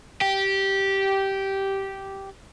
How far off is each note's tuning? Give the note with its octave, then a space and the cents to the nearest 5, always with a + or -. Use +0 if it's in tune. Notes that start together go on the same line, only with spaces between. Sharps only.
G4 -10